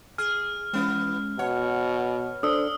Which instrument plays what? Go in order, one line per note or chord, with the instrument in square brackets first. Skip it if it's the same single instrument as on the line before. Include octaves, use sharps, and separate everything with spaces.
[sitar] G#4 [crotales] F6
[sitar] E3 B3 [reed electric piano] G#3 C#4
[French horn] B2 [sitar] C#5 [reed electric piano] F#5
[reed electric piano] D4 A4 D5 [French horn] C5 [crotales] D#6 E6